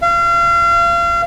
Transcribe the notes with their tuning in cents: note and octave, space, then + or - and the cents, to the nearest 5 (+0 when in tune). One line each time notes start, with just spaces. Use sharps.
F5 -35